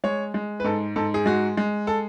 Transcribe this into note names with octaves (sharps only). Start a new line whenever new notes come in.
G#3 C#5
G#3
B4
G#2 A4
G#2 A4
G#4
G#3 F#4
G#3
A4